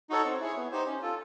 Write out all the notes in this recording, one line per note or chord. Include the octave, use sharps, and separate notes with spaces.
D#4 F#4 A4 C#5
C4
E4 G#4 C#5
B3
D#4 G4 C5
C#4
F4 A4